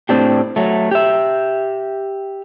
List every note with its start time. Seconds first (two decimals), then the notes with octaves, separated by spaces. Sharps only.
0.09 A2 C4 D4 G4
0.56 F#3 A3
0.91 G4 E5